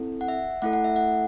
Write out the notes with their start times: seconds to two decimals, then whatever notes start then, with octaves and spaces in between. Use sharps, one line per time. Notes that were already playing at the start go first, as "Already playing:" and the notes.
Already playing: C4 E4 A4
0.21 F#5
0.28 E5
0.62 A3 E4 A4 F#5
0.73 F#5
0.84 E5
0.96 F#5